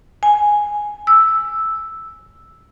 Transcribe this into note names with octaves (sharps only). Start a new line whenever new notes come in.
G#5
E6